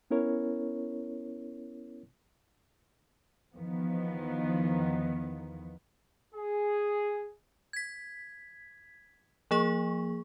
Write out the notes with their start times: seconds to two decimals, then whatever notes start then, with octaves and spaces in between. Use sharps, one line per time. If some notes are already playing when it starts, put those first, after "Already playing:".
0.11 B3 C#4 E4 A#4 C#5
3.55 E2 D#3 F3 B3
6.35 G#4
7.73 G#6 B6
9.51 F3 A#3 G#4 C#6